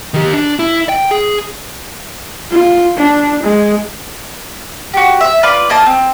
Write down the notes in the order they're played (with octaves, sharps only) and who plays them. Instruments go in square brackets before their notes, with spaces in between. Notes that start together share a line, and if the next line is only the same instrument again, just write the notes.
[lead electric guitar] D#3 G4
D4
E4
G5
G#4
[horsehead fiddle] F4
D4
G#3
[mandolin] F#4 G4
E5
F4 B4 D5
A#3 D#5 A5
C4